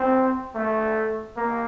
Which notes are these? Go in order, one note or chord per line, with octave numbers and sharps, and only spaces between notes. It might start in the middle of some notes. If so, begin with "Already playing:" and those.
Already playing: C4
A3
A#3